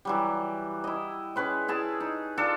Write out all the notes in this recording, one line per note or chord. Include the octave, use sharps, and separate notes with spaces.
E3 F#3 G3
E4 D#5
C#4 G#4 B4 C6
E4 G#4 A5
D#4
D4 F4 A4